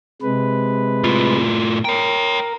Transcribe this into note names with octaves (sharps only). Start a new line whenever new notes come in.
C3 G#3 B4
A2 F4
A#4 C#5 G5